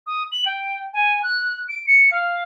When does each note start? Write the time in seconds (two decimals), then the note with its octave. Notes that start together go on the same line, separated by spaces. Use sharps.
0.06 D#6
0.32 F#7
0.46 G5
0.93 G#5
1.23 F#6
1.68 D7
1.87 C#7
2.11 F5